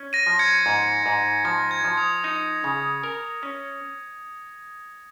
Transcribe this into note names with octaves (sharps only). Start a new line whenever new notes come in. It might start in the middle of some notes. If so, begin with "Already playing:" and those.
Already playing: C#4
A#6 D#7
F3
G#6 C#7
G#2
G#2
F3 A#6
G#6
F3
D#6
D#4
C#3
A#4
C#4